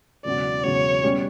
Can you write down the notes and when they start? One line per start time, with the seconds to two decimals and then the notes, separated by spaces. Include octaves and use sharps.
0.25 E1 E2 C#3 F#3 D5
0.64 E1 E2 C#3 F#3 C#5
1.03 B2 G3 C#4 G4